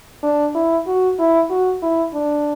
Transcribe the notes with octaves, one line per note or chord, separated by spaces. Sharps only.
D4
E4
F#4
E4
F#4
E4
D4